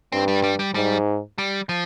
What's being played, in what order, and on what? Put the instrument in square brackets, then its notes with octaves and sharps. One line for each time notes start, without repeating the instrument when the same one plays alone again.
[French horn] G2 [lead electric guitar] C4
[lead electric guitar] G3
G3
G3
[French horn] G#2 [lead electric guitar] G3
[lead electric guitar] G3
F3